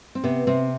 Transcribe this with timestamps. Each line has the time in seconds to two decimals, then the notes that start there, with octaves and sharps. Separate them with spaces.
0.15 C4
0.23 C3 B3
0.47 C3 C4